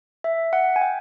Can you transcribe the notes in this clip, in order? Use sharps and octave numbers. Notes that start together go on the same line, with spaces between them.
E5
F#5
G#5
G5